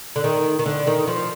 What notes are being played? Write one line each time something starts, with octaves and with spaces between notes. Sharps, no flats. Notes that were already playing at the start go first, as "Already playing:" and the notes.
D3
D#3
D#3
D3
D#3
F3